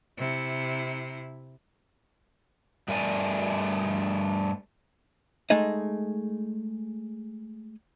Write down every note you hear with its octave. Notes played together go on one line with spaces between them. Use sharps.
C3 E4
G2 G3 A3 A#4 D5 G#5
G#3 A3 D#4 G#4 D#5